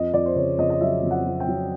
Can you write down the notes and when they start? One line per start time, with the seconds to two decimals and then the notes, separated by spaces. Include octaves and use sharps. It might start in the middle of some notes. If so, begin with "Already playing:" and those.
Already playing: F2 D#5
0.14 F2 D5
0.26 C5
0.36 C#3 C#5
0.59 F2 D#5
0.70 D#5
0.81 F#3 E5
1.03 F2
1.11 F#5
1.25 F#3
1.40 G5
1.48 F#3